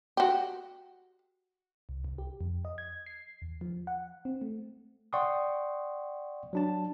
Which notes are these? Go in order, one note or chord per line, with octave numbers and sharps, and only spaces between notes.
F#4 G4
C2
C2
G4
F2
D#5
G#6
C7
E2
F3
F#5
C4
A3
D5 F#5 G5 C6 C#6 D#6
F#3 D4 A5